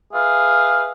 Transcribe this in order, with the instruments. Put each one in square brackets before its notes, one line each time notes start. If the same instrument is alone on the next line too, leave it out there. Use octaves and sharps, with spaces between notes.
[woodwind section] G#4 B4 E5 F5